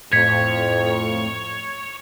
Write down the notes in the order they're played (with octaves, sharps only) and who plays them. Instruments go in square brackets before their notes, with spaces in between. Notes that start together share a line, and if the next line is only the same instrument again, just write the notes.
[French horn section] F2 [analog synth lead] A2 [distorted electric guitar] C#5 [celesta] G#6 B6